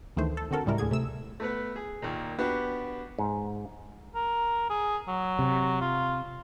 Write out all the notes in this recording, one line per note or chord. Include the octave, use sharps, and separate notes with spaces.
D2 D#3 E3 A3 C5
A4
D3 C4 F#4 A4 A#4
C#2 A2 G3 G#3 E4 A#4
D2 A2 D3 G#4 G#6
C3 A3 E6
A3 B3 B4
G#4
D#2 A#2
B3 D4 F#4 G4 B4
G#2
A#4
G#4
F#3
C3
F4